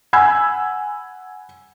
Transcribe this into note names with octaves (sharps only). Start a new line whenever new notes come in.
F#5 G#5 B5 E6 G#6